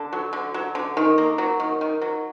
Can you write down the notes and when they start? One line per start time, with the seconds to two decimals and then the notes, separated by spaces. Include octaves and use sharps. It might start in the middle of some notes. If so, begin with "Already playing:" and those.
Already playing: D3 A4
0.13 F#3
0.33 D3
0.54 F#3
0.75 D3
0.97 D#3
1.18 A#3
1.38 F#3
1.60 D#3
1.81 D#3
2.02 F#3